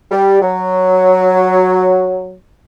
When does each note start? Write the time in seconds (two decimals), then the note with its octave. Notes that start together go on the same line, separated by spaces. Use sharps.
0.11 G3
0.41 F#3